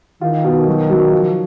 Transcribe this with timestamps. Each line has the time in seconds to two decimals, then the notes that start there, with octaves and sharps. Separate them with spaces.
0.21 D#3 F4
0.44 B2
0.67 F#3
0.90 F#3
1.12 F3